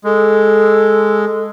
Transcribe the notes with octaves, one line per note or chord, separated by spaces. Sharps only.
G#3 A4